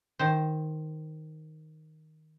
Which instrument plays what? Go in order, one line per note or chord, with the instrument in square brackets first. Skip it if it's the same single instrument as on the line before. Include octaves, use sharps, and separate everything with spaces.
[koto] D#3 C5